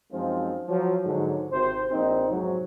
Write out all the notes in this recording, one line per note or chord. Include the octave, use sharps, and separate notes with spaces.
F#2 F3 G#3 C4 D#4 F4
F3 F#3
G#2 D3 F#3
G#1 C3 C5
A#1 A#2 C4 D#4
F2 G#2 C3 F#3